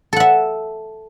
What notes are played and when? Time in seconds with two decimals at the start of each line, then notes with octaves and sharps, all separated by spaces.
0.13 A4
0.16 F#5
0.20 E5